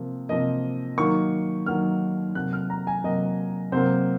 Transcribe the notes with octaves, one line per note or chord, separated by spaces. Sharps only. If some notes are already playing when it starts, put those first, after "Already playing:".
Already playing: C3 F3 A#3
C3 F3 A#3 D#5
D#3 F#3 A#3 C#6
D#3 F#3 A#3 F6
C3 F#3 A#3 F#6
F6
A#5
G#5
C3 F#3 A#3 D#5
C3 F#3 A#3 C5